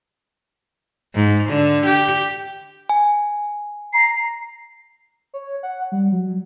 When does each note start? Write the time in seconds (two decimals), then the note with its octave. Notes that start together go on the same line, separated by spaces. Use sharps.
1.15 G#2
1.49 D3
1.86 G4
2.89 G#5
3.93 A#5 C7
5.34 C#5
5.63 F#5
5.92 G3
6.12 F#3